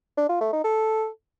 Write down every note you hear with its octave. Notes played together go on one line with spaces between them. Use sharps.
D4
F4
A3
D#4
A4